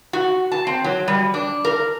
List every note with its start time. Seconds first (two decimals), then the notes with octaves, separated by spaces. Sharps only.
0.13 F#4
0.52 A5
0.67 C4
0.84 F#3
1.08 G3
1.34 D4
1.65 A#4